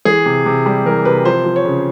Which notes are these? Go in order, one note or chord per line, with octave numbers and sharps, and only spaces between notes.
E3 G#4
C3
C3
G3
E3 A#4
C3 B4
F3 C5
F3
C#5
C#3